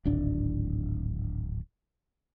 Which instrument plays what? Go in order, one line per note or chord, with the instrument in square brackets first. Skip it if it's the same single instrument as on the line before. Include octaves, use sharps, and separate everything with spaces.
[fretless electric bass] D1 G#1 D4